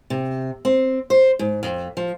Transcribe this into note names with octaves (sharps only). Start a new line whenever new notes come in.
C3
C4
C5
G#2
F2
F3